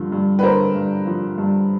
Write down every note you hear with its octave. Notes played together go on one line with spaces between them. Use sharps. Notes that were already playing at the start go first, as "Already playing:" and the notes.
Already playing: G2 D3 F3
G2
B4
D3 A#4 C5
G2
F3
G2